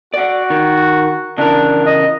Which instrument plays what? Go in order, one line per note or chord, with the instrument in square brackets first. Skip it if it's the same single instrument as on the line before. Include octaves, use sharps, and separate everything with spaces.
[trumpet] F#4 [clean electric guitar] D5 F#5
[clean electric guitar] D#3
[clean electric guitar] C#3 E3 A#4 [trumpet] D4
[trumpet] D#5